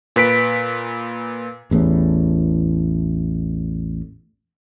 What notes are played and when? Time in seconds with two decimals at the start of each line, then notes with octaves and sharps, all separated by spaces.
0.16 A#2 B4 B6 D7
1.71 A1 E2 A2